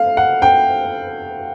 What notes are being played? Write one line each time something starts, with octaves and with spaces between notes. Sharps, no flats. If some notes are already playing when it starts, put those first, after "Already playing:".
Already playing: A3 F5
F#5
G5